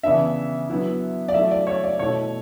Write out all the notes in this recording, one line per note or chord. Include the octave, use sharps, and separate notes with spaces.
C#3 E3 B3 D4 E5
D3 F#3 B3 E4
D5
F#3 A3 E4 E5
D5
C#5
D5
B2 A3 E4 C#5